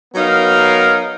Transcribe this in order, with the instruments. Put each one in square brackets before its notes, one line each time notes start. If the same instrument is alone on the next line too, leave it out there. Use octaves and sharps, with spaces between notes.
[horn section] F#3 B3 D#4 A#4 F5